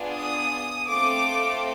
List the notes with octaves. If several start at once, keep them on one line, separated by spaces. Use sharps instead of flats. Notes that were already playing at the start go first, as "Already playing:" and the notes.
Already playing: B3 D4 F4 G#4
D#6
A3 C4 F4 A4 D6